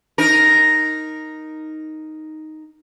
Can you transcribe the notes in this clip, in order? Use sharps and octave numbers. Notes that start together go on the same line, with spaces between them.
D#4 A#4